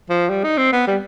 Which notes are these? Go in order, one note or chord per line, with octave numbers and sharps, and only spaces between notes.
F3
G3
D#4
C4
B3
G3